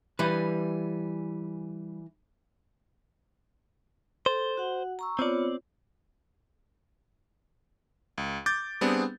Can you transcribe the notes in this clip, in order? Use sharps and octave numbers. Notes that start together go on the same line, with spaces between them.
E3 G3 B4 G#5
A4 C5
F#4 F#5
A#5 C#6 E6
B3 C4 F4 C#5 D5
C#2
D6 G6 A6
G3 B3 C4 D4 G#4